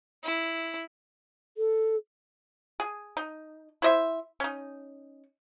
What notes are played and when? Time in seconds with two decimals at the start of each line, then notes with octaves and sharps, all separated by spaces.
0.24 E4
1.57 A4
2.80 G#4
3.17 D#4
3.82 E4 C5 D#5 E5
4.40 C#4 D#4